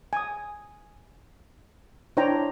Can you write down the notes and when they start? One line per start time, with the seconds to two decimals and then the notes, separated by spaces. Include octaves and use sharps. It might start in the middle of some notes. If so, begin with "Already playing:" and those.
0.13 G#5 D#6
2.17 D4 E4 C5 C#5 G5 A#5